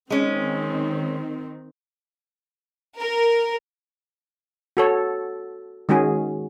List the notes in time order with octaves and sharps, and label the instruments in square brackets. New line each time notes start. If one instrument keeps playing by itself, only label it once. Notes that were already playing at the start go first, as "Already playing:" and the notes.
[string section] D#3 C4 [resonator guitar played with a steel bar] G#3 C#4
[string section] A#4
[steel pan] F#4 A4 C#5
D#3 G#3 C#4 F#4 G#4